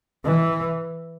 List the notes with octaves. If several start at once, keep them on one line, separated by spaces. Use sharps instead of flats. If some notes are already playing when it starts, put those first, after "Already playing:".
E3